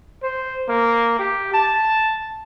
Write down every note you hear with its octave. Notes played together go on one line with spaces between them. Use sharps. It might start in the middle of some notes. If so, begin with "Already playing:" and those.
C5
A#3
G4
A5